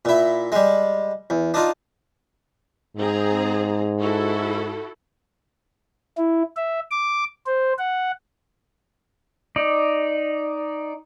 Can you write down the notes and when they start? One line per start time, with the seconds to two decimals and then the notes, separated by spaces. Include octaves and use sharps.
0.05 A#2 E4
0.52 G3 G#3
1.30 E2
1.54 D4 D#4 F4
2.97 G#2 C4 G#4 A#5
3.98 E4 F#4 A4
6.18 E4
6.57 E5
6.91 D6
7.46 C5
7.78 F#5
9.56 D#4 D5